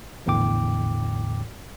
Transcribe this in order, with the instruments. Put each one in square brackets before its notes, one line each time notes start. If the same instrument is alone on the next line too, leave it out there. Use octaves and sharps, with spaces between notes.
[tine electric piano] A#1 E2 A2 D3 G5 D6